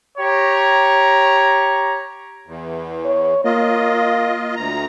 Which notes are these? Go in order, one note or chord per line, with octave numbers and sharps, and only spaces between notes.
G4 C#5 A#5
E2
C#5
A#3 F4 D#5
D2 A#5